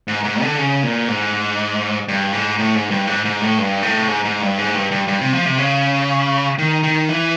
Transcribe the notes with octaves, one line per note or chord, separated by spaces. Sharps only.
G#2
G#2
D3
C#3
A#2
G#2
G2
G#2
A2
G#2
G2
G#2
G#2
A2
G2
A2
G#2
G#2
G2
G#2
G2
G2
G2
C3
F3
C3
C#3
D#3
D#3
E3